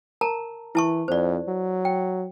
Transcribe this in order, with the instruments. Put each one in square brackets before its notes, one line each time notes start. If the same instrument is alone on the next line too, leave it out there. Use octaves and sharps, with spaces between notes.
[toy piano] A#4 A5 A#5
[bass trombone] E3 [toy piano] E4 A5 C#6
[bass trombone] F2 [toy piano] C5 D5
[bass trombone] F#3
[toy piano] G5